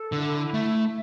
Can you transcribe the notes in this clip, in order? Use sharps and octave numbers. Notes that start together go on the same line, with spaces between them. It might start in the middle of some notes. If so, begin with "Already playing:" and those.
Already playing: A4
D3 E4
A3 E5